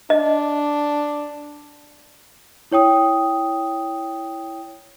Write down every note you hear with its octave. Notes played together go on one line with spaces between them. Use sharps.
D4 D#5
E4 C#5 G5 D#6